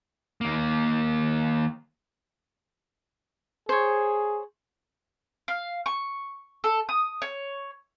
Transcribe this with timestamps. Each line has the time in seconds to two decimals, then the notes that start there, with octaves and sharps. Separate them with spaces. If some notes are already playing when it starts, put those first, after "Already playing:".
0.41 D#2 A#3
3.69 G#4 C5 C#5
5.48 F5
5.86 C#6
6.64 A4
6.89 D#6
7.22 C#5